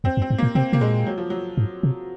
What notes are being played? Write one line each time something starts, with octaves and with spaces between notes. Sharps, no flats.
F2 C4
F#2
C4
G#2
A#2 A#3
C3 C4
C3 A#3
A#2 G#3
F#3
F3
F#3
G#2
C3